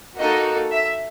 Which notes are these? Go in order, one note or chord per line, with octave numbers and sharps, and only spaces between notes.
A#3 D#4 F#4 A4 D#5
E5